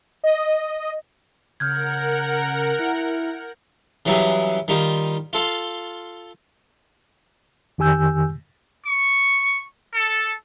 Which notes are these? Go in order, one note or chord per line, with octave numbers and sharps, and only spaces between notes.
D#5
C#3 A#4 F#5 F6 G6 G#6
E4
C#3 E3 F#3 G3 E4 G#4
D#3 G3 D#4 F4
F4 A4 F5 C6
F2 D#3 G4 G#5 E6 G6
C#6
A4